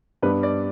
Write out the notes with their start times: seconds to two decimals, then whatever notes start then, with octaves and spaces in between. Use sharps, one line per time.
0.22 G2 G3 B3 D4 B4
0.43 D5